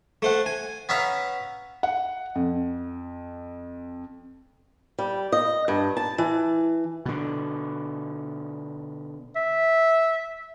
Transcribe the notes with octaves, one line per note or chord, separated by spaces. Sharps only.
A3 C5 F#5
G#5
B3 C#4 E5 F5 A#5
F#5
F2
G3
D#5
G2
A5
E3
B2 D3
E5